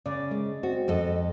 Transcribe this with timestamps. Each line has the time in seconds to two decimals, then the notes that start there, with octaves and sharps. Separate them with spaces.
0.06 C#3 D5
0.31 G#3
0.63 C4 F#4
0.88 F2 A4 D#5